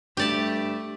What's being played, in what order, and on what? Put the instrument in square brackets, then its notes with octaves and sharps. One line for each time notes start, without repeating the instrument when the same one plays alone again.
[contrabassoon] G2 [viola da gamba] A3 [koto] G4 D5 A5